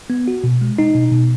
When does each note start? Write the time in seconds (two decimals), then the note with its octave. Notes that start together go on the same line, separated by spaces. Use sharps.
0.10 B3
0.28 F#4
0.44 B2
0.61 G#3
0.79 D#4
0.95 B2
1.12 B2